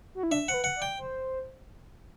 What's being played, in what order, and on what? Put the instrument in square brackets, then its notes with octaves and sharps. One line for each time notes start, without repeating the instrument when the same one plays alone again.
[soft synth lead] F#4
E4
[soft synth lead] D4 [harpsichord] E5
[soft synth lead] C5 [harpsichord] F#5
[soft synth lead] B4
[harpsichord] F#5
[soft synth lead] D5
[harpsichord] G5
[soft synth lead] C5